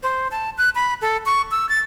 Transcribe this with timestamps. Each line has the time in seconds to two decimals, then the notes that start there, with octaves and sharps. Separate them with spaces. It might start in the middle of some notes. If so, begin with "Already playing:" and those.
0.03 C5
0.31 A5
0.58 F#6
0.75 B5
1.02 A4
1.26 C#6
1.51 E6
1.69 A6